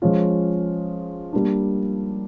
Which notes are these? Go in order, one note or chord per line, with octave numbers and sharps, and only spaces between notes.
F3 G#3 C#4 F4
G3 A#3 D4